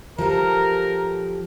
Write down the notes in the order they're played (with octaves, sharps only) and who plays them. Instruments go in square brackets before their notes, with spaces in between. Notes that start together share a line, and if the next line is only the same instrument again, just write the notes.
[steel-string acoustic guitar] F3 G4 A4 [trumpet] A#4